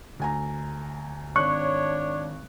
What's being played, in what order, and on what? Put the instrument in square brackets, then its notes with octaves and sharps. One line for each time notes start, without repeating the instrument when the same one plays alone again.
[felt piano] D2 G#5 A#5
[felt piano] G#1 F#6 [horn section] D4 C#5 [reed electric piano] C#6